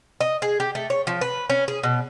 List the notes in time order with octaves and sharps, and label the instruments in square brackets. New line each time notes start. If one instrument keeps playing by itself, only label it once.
[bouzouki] D#5
G#4
G4
A3
C#5
F3
B4
C#4
G#4
B2